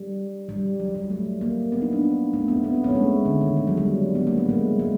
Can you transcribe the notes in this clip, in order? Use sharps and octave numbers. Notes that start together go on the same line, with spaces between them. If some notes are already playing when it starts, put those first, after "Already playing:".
Already playing: G3
G3
F#3
G3
A3
A#3
B3
D#4
D4
A3
B3
B3
C4
C#4
A3
G#3
D3
D#3
G#3
F#3
G3
B3
A#3
A3
G#3
G#3